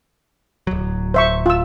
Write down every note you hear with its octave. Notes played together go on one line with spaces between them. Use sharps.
D1 F#3
C5 E5 C#6
F4 E6